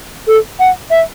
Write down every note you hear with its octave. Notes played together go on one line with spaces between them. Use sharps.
A4
F#5
E5